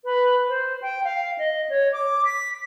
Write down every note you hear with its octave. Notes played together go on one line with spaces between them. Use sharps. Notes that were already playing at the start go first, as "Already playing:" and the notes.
B4
C5
G5
F5
D#5
C#5
D6
B6